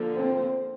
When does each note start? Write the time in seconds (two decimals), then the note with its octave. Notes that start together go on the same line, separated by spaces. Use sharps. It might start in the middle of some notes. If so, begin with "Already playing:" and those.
Already playing: D3 F3 A#3
0.16 C4